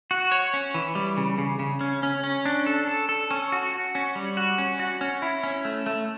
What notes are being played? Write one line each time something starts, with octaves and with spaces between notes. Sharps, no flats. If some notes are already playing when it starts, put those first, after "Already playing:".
F#4
C#5
C#4
E3
G3
C#3
C#3
C#3
C#4
C#4
C#4
D4
A4
A4
A4
C#4
F#4
F#4
C#4
G3
F#4
C#4
F#4
C#4
E4
C#4
A3
A3